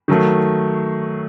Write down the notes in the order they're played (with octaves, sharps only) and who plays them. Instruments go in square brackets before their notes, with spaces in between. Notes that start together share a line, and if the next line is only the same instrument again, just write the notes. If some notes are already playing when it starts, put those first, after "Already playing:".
[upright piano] D#3 F#3 A3